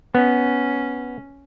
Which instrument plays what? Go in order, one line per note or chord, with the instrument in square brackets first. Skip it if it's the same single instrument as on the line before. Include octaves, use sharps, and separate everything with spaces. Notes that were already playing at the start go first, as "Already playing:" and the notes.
[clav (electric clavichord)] B3 [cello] C#4